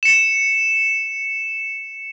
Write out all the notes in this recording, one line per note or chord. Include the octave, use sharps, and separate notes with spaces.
C#7 E7